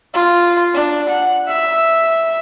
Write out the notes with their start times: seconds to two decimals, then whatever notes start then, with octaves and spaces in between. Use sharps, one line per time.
0.14 F4
0.74 D4
1.09 F#5
1.48 E5